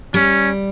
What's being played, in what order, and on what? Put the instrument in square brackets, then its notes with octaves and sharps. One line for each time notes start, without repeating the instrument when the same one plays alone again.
[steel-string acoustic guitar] G3 [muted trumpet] C#4